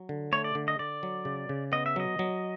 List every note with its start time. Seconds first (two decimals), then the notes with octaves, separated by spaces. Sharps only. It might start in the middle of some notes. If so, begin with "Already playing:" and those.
Already playing: F#3
0.09 D3
0.32 A3 C#5
0.44 D5
0.55 D3
0.68 D#5
0.79 D3 D5
1.03 F#3
1.25 C#3
1.49 C#3
1.72 B3 D#5
1.86 E5
1.96 F#3 D#5
2.19 F#3